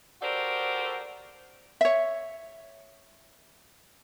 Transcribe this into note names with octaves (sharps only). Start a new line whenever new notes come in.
F#4 G4 A4 A#4 C5 D5
C#5 E5